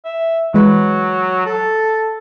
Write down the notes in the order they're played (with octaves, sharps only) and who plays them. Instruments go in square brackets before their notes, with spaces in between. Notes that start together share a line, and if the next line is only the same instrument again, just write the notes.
[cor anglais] E5
[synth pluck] E3 G#3 B4 [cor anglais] F#3
[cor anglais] A4